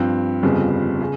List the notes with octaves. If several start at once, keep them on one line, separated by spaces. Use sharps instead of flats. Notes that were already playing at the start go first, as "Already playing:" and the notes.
Already playing: G2 F3 C4
G1 F2 C#3 G3
C#3